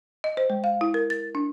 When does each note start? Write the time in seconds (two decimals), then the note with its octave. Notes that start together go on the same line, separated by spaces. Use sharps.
0.24 D#5
0.37 C5
0.50 G#3
0.64 F5
0.81 E4
0.94 A#4
1.10 A6
1.35 D4